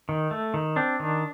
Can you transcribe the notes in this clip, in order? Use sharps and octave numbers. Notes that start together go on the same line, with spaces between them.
D#3
A3
D#3
C4 D4
D#3